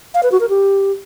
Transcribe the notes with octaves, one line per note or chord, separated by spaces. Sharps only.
F5
B4
F#4
A#4
G4